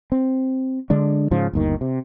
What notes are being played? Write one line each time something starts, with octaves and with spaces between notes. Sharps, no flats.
C4
D3 G#3 D4
G#2 C#3 F3
G1 D#2 D#3
C3